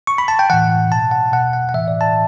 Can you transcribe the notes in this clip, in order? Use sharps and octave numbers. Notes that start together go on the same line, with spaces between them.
C#6
B5
A5
G5
A2 E3 F#5
B2 A5
F#5
B2 F#5
F#5
F#5
A2 E3 E5
D5
A5